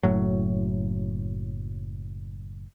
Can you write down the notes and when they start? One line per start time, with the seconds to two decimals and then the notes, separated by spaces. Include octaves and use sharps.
0.03 F#1 A2 F#3